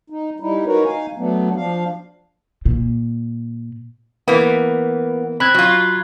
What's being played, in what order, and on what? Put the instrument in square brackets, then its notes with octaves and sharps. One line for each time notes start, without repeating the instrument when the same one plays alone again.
[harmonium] D#4
G3 D#4 E4
D#4 F#4 A#4 B4 C#5
D#4 F5 G#5
F#3 A3 B3 D4
F3 D4 F5
[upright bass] A#2
[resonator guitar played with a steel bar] E3 A#3 [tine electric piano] B3
[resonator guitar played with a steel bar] C4 [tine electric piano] B5 F#6 G#6
[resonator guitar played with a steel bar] F#3 F4